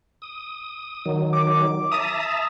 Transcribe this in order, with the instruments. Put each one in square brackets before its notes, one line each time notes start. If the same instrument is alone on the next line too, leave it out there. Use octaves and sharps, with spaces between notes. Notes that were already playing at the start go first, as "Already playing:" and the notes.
[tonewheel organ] D#6
D#3 F#3
[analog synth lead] D6
[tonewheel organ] E5 A5 A#5 [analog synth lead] D#6